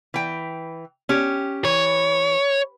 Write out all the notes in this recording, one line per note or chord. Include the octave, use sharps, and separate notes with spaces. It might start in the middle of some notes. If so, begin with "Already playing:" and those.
E3 G5
C#4 G4
E3 C#5